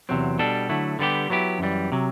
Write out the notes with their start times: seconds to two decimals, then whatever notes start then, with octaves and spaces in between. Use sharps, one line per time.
0.09 E2 C3 F#3 C4
0.39 B2 G3 D4 A4
0.69 D3 F#3 A3 E4
0.99 D3 G3 B3 E4 G4
1.30 F#3 B3 E4 G4
1.59 F#2 E3 G3
1.92 C3 F#3